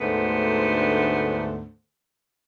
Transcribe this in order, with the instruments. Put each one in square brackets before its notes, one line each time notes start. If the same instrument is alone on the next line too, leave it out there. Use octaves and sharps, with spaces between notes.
[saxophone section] D2 G#2 D3 A3 B3 C5